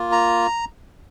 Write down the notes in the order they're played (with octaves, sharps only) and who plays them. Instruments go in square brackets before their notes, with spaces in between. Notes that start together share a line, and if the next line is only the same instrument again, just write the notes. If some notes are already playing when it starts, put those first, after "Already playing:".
Already playing: [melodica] A#3 F4
A#5